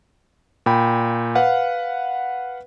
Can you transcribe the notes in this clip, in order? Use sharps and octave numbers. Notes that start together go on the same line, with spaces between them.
A#2 G5 B5
B4 F5 F#5